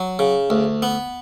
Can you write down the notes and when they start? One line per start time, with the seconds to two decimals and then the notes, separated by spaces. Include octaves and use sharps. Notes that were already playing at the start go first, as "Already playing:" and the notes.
Already playing: F#3
0.19 C#3
0.50 D2
0.82 B3